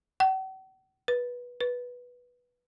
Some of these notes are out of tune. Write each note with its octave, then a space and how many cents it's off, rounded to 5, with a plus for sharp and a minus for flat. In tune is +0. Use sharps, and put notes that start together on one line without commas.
F#5 +45
B4 -15
B4 -10